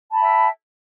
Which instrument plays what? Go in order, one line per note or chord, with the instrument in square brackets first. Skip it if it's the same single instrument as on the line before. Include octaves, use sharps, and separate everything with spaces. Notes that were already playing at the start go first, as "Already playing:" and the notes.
[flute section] A5
B5
G5
E5